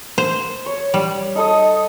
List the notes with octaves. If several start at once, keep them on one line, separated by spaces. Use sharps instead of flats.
C5
C#5
G3
D#4 A4 D#5